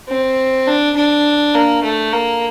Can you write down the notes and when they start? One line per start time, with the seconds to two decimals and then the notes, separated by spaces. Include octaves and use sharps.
0.09 C4
0.67 D4
0.96 D4
1.54 A#3
1.83 A3
2.13 A#3